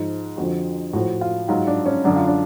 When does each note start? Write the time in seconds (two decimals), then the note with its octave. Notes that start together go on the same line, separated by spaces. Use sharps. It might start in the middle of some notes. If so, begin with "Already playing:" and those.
Already playing: G#2 F3
0.37 F2 D3 F3 F#4
0.93 A2 F3 F#4
1.21 F4
1.48 G#2 F#3 F4
1.67 D4
1.86 C#4
2.04 F#2 D3 F#3 D4
2.16 F4
2.28 D4